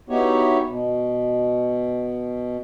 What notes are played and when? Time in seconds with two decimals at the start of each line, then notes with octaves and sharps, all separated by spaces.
0.09 B3 D#4 E4 F#4 G4 C#5
0.68 B2